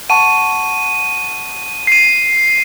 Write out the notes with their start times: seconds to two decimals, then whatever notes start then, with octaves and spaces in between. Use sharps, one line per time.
0.10 F#5 A5 C#6 D#7
1.87 C7 D#7